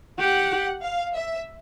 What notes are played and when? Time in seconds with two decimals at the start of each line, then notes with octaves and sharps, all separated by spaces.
0.19 G4 F#5
0.82 F5
1.15 E5